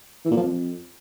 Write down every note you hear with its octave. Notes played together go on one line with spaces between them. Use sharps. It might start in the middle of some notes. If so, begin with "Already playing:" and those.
E3
A#2
F3
F2